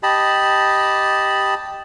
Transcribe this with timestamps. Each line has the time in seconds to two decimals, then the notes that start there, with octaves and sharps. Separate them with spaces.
0.03 G4 D#5 A5 B5